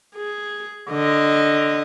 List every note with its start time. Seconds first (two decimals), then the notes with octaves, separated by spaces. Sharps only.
0.15 G#4
0.90 D3 D#5